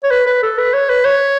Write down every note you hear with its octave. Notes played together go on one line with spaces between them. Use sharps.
C#5
B4
B4
A4
B4
C#5
B4
C#5